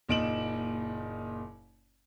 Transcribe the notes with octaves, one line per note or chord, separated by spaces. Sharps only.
F#1 A#2 D#4 D7 E7 F#7